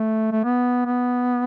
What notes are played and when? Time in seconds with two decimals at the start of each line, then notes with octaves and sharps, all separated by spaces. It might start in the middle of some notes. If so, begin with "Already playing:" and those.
Already playing: A3
0.32 A3
0.44 B3
0.86 B3